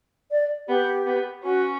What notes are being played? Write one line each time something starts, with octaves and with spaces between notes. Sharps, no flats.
D5
B3 G4
B3
C#4 F#4